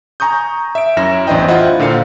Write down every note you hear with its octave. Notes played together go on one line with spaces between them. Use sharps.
G#5 A#5 C#6 D#6 G6
E5 D7
F#2 C#4 E4 A#6 E7
A1 E2 D4 C5 D#5 G5
E4 F4 C5 D#5 F#5
A#2 D3 C5 F5 C#7